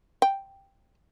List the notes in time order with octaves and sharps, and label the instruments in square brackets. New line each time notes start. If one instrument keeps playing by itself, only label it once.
[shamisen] G5